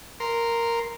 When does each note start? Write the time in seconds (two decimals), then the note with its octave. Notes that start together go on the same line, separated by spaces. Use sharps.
0.20 A#4 C6